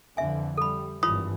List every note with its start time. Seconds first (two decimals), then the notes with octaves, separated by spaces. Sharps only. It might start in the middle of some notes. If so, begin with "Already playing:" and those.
0.17 F2 D3 E3 E5 G#5
0.57 G3 A4 B5
1.03 G#1 G2 E3 F4 C#5 B5 D#6